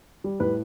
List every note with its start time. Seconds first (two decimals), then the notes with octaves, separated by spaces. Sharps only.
0.24 G3
0.40 A2 B4